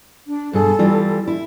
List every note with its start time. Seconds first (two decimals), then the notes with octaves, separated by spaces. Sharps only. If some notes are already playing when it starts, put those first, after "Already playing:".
0.27 D4
0.53 G2 B2 G#4 A4
0.79 E3 G3 F4
1.28 E4